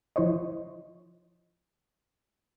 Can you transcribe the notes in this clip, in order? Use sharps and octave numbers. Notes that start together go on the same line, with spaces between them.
F3 E4 C5 C#5 D#5